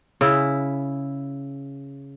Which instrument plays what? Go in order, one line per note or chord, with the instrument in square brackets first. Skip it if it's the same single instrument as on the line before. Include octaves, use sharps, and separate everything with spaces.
[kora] C#3 E4